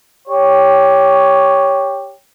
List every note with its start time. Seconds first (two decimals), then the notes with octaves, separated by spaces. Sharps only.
0.27 G4 C#5